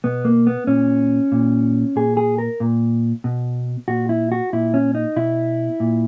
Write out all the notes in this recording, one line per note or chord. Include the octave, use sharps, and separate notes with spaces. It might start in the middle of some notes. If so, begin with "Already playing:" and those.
B2 B3
A#3
B3
A#2 C#4
A#2
A#2 G#4
G#4
A#4
A#2
B2
A#2 F#4
E4
F#4
A#2 E4
C#4
D#4
B2 E4
A#2